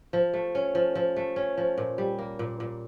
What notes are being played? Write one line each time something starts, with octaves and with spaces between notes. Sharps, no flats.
F3
A3
C#4
F3
F3
A3
C#4
F3
A#2
G3
A#3
A#2
A#2